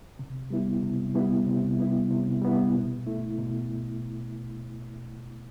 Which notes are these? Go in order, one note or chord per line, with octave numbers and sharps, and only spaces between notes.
C3
G3 B3 E4
C3
G3 B3 E4
C3
G3 B3 E4
C3
G3 B3 E4
B2
A3 E4
B2